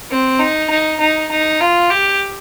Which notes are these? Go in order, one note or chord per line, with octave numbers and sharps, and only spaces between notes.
C4
D#4
D#4
D#4
D#4
F4
G4